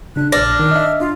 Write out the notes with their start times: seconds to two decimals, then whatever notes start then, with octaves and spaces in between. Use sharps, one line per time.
0.16 C#3 D4 F#6
0.32 A#1 D4 F6 A#6
0.59 D#3
0.71 D#5 E5
1.00 D4 F4